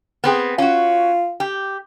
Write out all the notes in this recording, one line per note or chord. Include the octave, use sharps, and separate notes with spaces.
B3 C4 G#4
C#4 F4 F#4
G4